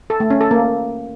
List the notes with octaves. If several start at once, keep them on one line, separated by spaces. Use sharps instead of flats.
A4
A3
C#4
A4
A#3